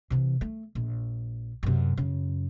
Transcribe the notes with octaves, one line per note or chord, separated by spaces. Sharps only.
C3 E3
A3
A#1
F#2 C3
F#2 C#3